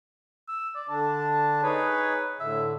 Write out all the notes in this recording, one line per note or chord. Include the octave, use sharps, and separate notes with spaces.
E6
D5
D3 D4 A5
D#4 G#4 B4 C#5
A2 D3 E5